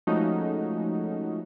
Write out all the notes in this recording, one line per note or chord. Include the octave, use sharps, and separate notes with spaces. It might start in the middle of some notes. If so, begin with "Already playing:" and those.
F3 G#3 A3 C#4 D#4 F#4